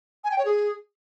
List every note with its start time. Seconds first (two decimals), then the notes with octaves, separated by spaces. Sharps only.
0.24 G#5
0.31 G5
0.38 C#5
0.45 G#4